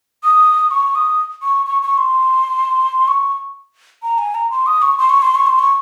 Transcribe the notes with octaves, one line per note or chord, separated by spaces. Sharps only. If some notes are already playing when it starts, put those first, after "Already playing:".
D#6
C#6
D#6
C#6
C#6
C#6
C6
C#6
A#5
G#5
A#5
C6
D#6
C#6
C6
C#6
C6
C#6
C6
C#6